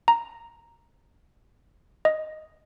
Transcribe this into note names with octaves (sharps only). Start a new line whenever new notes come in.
A#5
D#5